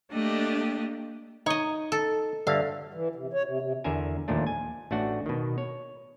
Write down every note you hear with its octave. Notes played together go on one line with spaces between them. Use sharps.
A3 A#3 D4 G4 D#5
D#4 C#5 D#5
A4
G2 D3 E5 F5
E3
C3
C#5
C3
C3
E2 D3 A#4 E5 G#5
D#2 A#2 F3 A3 D4
G#5
A1 A3 D4 F#4 F#5
B2 D#3
C#5